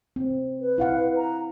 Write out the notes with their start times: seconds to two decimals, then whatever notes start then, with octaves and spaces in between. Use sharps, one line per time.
0.16 C4
0.61 B4
0.78 E4 F5 F#5
1.16 A#5